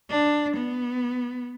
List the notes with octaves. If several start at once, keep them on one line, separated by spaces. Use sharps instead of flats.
D4
B3